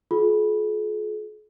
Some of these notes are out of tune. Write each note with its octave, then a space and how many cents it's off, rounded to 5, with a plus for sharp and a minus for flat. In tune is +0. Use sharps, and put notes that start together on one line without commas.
F4 +35 G#4 +45